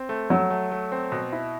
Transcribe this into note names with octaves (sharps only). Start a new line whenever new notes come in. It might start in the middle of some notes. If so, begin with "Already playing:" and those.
Already playing: C4
A3
F#3 A3
A3
A3
C4
B2
E4